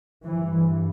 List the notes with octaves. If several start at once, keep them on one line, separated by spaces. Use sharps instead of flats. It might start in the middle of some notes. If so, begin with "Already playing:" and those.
G2 E3